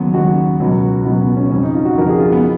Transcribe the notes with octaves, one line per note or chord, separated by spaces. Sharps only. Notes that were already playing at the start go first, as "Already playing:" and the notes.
Already playing: D#2 C#3 F#3 B3
D#2 C#3 F#3 F#4
C#2 B2 F#3
C#2 B2 F#3 B3
B3
C#4
F2 C#3 F3 C#4
D#4
F4
F#4
F2 C#3 F3 A#4
G#4
F4
B3